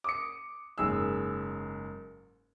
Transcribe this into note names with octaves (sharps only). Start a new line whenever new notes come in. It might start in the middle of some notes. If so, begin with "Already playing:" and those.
D6 D#6 C#7
F#1 G#2 G#4 E6